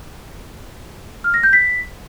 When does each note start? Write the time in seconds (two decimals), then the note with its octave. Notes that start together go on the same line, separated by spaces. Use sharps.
1.24 F6
1.34 A#6
1.43 G6
1.53 B6